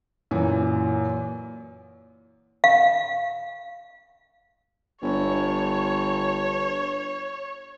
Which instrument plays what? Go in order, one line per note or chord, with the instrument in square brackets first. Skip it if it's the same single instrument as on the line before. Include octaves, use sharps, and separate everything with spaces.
[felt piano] F#2 A#2 E3
[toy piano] F5
[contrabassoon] G1 [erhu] C#5